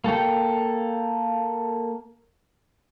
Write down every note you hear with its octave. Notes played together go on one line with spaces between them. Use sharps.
A#3 A4 G5